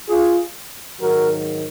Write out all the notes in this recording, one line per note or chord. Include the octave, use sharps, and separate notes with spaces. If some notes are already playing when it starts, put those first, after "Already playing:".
F4 G#4
G#2 D#3 F#3 F#4 A#4